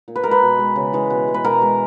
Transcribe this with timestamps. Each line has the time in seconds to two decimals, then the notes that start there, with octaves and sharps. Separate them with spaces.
0.08 A#2
0.16 B4
0.24 G#3 A#4
0.31 B4
0.42 B2
0.59 G#3
0.76 C#3
0.93 E3 G#3
1.10 B2
1.28 G#3
1.34 B4
1.44 B2 A#4
1.62 G#3